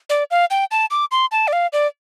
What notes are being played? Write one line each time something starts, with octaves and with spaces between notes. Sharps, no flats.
D5
F5
G5
A5
D6
C6
A5
D5
F5
D5